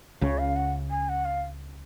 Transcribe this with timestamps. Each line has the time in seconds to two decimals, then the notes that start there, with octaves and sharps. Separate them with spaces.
0.21 C#2 C#3 C#5
0.38 F5
0.56 F#5
0.90 G#5
1.09 F#5
1.25 F5